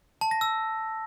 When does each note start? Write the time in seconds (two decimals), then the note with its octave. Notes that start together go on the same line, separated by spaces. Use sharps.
0.21 A5
0.31 A#6
0.41 E6